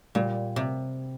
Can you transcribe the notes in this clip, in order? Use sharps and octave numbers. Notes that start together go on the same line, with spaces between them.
A#2 G3
C3 C4